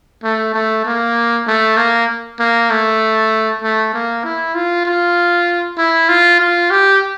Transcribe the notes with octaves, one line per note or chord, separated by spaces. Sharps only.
A3
A3
A#3
A3
A#3
A#3
A3
A3
A#3
E4
F4
F4
E4
F4
F4
G4